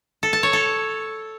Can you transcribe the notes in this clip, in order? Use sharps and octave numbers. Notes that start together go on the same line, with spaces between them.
A4
A5
C#5
A4